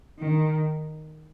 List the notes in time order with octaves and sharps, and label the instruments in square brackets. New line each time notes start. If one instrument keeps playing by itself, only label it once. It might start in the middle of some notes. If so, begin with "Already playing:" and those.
[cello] D#3